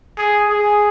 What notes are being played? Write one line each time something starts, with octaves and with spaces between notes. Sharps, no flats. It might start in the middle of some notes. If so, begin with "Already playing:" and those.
G#4
G#4